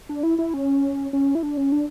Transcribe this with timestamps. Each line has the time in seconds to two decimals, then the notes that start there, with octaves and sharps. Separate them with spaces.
0.09 D4
0.23 E4
0.39 E4
0.54 C#4
1.13 C#4
1.35 E4
1.43 D4
1.57 C#4
1.72 D4